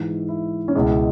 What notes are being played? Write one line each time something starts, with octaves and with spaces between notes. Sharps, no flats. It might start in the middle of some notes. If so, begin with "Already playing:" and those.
Already playing: G#2 E3 G#3 E4
E4
C#4
C#2 B2 G#3 E4